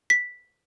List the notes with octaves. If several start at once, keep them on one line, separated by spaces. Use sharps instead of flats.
B6